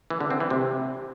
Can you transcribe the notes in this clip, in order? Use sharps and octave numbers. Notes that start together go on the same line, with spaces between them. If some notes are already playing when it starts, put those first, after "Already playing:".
E3
D3
C4
E3
C3